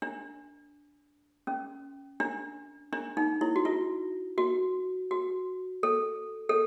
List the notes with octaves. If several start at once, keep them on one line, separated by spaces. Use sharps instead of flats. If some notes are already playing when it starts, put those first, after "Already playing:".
D4
C#4
D4
D4
D#4
E4
F#4
F4
F#4
F#4
A4
A4